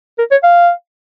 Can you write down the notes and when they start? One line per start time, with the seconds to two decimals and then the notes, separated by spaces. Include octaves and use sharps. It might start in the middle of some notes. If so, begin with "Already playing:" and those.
0.18 A#4
0.31 C#5
0.43 F5